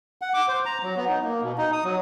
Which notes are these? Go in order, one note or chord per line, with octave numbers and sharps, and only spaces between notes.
F#5
D6
C5
A#5
F#3
B3
D#4
A#3
B2
D#4
D#6
F#3